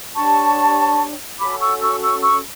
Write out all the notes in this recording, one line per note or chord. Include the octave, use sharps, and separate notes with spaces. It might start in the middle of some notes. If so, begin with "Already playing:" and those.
D4 G4 C#5 A5 C#6
C#4 F#4 A4 B5 D6
C#6 E6
C#6 E6
C#6 E6
C#6 E6